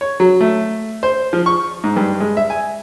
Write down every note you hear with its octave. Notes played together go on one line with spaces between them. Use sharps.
C#5
F#3
A3
C5
F3
C#6
G#2
G2
G#3
E5
G#5